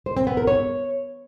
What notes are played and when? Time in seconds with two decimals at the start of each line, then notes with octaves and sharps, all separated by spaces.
0.06 C5
0.17 C4
0.27 B3
0.37 A#4
0.47 C#5